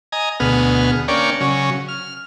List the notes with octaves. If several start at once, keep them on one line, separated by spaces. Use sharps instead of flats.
D#5 G#5 A#5
D2 B2 B3 G#4 F6
A#3 C#4 D4 C#5 D5 G5
C#3 F#3 C#4
F6